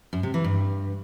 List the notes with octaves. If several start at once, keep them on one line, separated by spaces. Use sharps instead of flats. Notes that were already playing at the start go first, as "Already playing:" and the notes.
F#2
C3
E3
G2